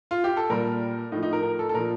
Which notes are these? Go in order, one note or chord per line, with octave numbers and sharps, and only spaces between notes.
F4
G4
A4
A#2 G3 A#4
A2 F3 D#4
D#4
A#4
A#4
A4
A4
A#2 F3 A#4